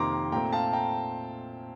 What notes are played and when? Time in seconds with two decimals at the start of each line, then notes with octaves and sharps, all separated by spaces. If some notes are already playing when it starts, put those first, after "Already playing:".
Already playing: F2 C3 D#3 A#3 A#5 C6 D6
0.32 A#2 A3 C4 G5 A#5
0.53 F5 A5
0.73 G5 A#5